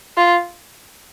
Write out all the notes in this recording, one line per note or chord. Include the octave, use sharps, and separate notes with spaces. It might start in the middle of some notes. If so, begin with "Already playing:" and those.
F4